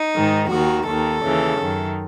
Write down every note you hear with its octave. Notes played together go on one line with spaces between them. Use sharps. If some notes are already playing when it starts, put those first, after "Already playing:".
Already playing: D#4
G#2 D#3
D#2 D#3 F#4
D#2 D#3 A4
D#2 C#3 E3
F#2 D#3